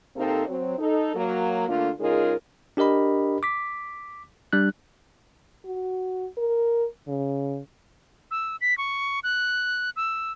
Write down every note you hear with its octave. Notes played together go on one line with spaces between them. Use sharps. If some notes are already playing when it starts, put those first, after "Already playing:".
C3 A#3 C4 D#4 A4
F#3 C4
D#4 A4
F#3 A#3
D3 A3 A#3 D4 F4
C#3 G#3 D#4 F4 G#4 A#4
D4 G4 A#4 D#5 B5
D6 B6
G3 D4 F#6
F#4
A#4
C#3
E6
B6
C#6
F#6
E6